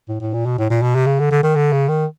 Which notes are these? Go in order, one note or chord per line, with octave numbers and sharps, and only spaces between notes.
A2
A2
A#2
B2
A2
A#2
B2
C3
C#3
D3
D3
D#3
D3
C#3
D#3